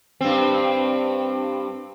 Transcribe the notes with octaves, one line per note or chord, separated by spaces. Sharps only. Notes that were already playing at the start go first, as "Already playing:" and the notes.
G2 C4